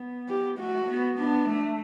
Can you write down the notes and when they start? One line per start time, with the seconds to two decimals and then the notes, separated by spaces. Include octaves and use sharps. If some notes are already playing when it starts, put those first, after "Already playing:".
Already playing: B3
0.29 G4
0.58 A3 F#4
0.88 B3
1.18 B3 D4
1.48 A3